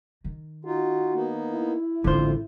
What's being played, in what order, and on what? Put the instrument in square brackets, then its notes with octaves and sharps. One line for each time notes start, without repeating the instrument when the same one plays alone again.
[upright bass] D#3
[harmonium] D#4 F4 [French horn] F#4
[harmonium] A#3 B3 D#4
[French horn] E4
[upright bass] A1 G#2 [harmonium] F2 F4 [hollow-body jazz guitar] D3 C5